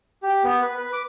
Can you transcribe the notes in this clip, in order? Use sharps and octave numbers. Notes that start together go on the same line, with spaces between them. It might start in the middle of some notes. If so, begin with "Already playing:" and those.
G4
B3
B4
B4
D6